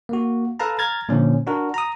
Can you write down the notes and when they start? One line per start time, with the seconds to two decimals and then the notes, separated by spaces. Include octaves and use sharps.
0.09 A#3 F#4
0.60 A4 B4 F5 A5 A#5
0.79 A#5 F6 G#6 A6
1.09 A#2 D3 F3 C#4
1.47 D4 F#4 A#4
1.74 A#5 D#6